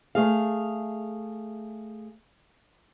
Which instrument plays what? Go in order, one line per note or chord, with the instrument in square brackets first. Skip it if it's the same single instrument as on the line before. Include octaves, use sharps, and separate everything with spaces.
[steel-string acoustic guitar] A3 G#4 F5